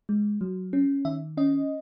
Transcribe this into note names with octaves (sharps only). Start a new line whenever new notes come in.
G#3
F#3
C#4
D#3 E5
C#4 D#5